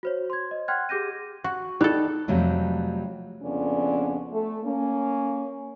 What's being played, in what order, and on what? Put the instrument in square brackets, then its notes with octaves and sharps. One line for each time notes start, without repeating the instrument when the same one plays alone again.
[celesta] F#4 C5 C#5
C6 G#6
D#5
F#5 G5 C6 F6 F#6 G#6
G4 G#4 D6 G6 A#6 D#7
[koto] F#4
[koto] G3 A4 [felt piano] D#4 F#6
[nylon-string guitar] F2 C3 F#3 G3 A3
[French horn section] F2 C#3 B3 C#4 D4
A3
A#3 C#4